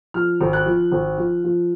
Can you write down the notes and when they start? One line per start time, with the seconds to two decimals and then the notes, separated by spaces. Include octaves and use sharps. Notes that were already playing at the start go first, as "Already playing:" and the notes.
0.14 F3 F6
0.41 G#1
0.53 F#6
0.66 F3
0.92 G#1
1.18 F3
1.44 F3